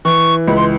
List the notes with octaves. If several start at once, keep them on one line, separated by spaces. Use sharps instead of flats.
E3 C#6
C#2 B5
C6